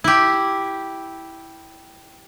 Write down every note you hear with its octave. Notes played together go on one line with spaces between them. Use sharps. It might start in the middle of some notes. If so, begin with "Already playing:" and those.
E4 G4